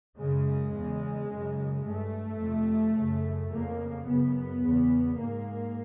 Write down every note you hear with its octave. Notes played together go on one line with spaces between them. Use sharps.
F#2 C#3 G#3
E2 C#3
F#2 C#3
G2 A3
F2 C3
F#2 C#3
F2 C#3 A#3
F#2 C#3 B3
E2 C#3
G#2 A#3